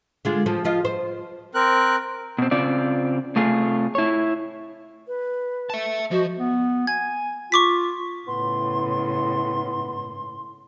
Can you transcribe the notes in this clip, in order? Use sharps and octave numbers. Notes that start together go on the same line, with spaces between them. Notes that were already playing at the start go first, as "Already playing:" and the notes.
D3 G#3 F4
F3
F3 F4 D#5
C5
C4 A#4 F#6
B2 C4
C#3 C4 F4 D5
C3 A3 F4 G#4
E4 C#5
B4
E5 A5
F3 F#4 C5 D#5
B3
G#5 G#6
F4 C#6 D6 B6
A2 C#3 B3 C6